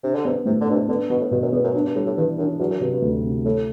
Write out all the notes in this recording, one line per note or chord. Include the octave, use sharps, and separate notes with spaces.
C3 D4
D3
C3 B3
A2 C3
D3
B2 D4
C3
D3 B3
B2 B3
A2
G2 B2
F#2
E2 B3
F#2
F#2 D4
G2
A2 G3
A2
G2 E3
F#2 D4
E2 F#3
F#2
G2 C3
G2
D2
C3
A2 A3